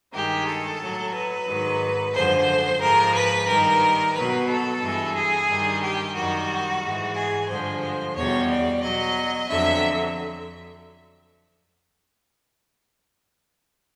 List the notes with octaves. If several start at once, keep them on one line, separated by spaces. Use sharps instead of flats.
G2 D#3 G#3 G4
A4
A2 F#3
B4
G#2 D#3 F#3
F#2 D3 F3 G#3 C5
G#2 F3 G#3 A#4
B4
G2 D#3 G3 A#4
B2 F#3 B4
A4
G2 E3 G#3
G#4
G2 D#3 G3
G4
F#2 D#3 G3 F#4
G#2 E3 G#3
G#4
G2 D3 F3 G#3 C5
E2 B2 G3 C#5
D5
B2 F#3 D#5
F2 D3 F#3 E5